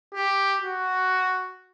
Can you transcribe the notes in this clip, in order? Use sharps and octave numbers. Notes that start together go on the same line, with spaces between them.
G4
F#4